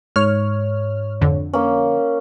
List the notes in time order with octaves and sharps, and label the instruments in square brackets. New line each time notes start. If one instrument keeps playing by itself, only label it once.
[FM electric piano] G#2 C#5 [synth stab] F6
[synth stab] F2 D3
[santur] A#3 C#4